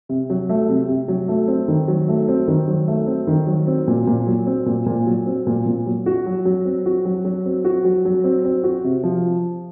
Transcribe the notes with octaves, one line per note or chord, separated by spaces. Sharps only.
C3
F#3
A3
C3
C3
F#3
A3
C4
D#3
F#3
A3
C4
D#3
F#3
A3
C4
D#3
F#3
C4
A#2
A#2
F#3
C4
A#2
A#2
F#3
C4
A#2
A#2
F#3
F#4
F#3
F#3
C4
F#4
F#3
F#3
C4
F#4
F#3
F#3
C4
C4
F#4
C3
F3